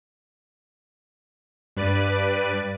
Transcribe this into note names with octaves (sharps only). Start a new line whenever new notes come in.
G2 B4 D5 D#7